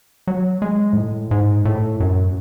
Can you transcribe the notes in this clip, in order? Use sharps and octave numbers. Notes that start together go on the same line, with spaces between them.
F#3
G#3
G#2
A2
G#2
A2
F#2